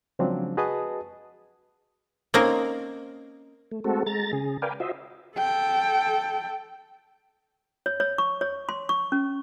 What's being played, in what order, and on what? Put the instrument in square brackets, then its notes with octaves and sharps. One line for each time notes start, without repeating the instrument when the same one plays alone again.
[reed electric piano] C#3 F3 F#3 G#3 C4 D4
F#4 G#4 B4 D#5 A5 D#6
[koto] A#3 C4 C#4 D#4 A#4 C5
[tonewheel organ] A3
G#3 A3 C4 F#4 A4
G#3 A#5 A6
C#3 G#4
A#4 B4 D5 F5 G5 G#5
F4 F#4 C5 D#5 E5
[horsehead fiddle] A4 G5
[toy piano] C#5
C#5
C#6
C#5
C6
C#6
C#4